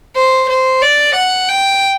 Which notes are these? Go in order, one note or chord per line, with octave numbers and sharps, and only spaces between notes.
C5
C5
D5
F#5
G5